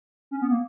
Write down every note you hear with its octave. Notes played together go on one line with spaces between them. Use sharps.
C#4
B3
A#3